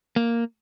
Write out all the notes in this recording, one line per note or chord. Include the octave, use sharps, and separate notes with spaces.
A#3